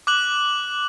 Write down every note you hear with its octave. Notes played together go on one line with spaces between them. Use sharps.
D6 F#6 F#7